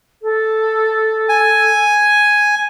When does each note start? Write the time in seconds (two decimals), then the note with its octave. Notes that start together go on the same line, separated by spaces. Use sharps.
0.22 A4
1.29 G#5